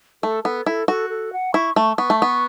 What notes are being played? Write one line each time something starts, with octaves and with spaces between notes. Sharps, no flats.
A3 A4
B3 A4
E4 A4
F#4 A4
A4
F#5
E4 C#6
A3 C#6
B3 C#6
A3
B3 C#6